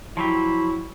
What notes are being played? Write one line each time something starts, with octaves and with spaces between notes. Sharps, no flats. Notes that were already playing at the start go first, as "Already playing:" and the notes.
F3 F#3 E4 G4